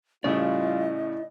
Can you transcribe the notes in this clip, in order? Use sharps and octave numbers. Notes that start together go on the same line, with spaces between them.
A2 C#3 G3 E4 F4 D5 D#5